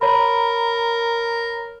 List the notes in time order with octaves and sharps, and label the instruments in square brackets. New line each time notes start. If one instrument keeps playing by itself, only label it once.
[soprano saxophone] A#4 [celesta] C#5 A#5 B5